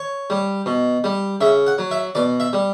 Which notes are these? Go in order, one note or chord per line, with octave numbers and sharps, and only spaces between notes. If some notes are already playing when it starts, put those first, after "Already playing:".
Already playing: C#5
G3
B2
G3
C#3 E5
F#5
F#3
E5
B2 D5
E5
G3